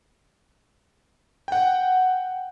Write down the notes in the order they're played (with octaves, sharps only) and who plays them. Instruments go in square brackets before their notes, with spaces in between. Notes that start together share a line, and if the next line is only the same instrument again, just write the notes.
[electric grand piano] F#5 G5